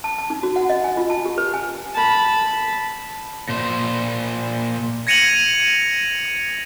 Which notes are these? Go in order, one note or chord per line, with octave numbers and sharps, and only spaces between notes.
A5
A5
D#4
F#4
F#5
D#5
G#5
F4
A5
G4
B4
G#5
A5 B5
A#2 C5
G#6 A#6 C#7 D#7 F7 F#7